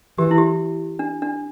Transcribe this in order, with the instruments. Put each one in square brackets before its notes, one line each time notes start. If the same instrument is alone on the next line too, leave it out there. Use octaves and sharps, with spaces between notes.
[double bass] E3 [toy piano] G4
[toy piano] E4
G4
D4
D4